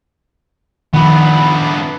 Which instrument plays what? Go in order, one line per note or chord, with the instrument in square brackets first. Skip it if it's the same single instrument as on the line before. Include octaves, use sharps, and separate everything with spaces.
[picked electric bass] D#3 F3 [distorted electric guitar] B3 D4 [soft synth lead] B5